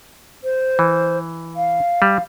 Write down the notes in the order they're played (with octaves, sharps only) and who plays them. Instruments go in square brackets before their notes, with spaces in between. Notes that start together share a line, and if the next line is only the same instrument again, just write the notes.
[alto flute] C5
[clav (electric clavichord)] E3
[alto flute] F5
[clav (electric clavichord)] G3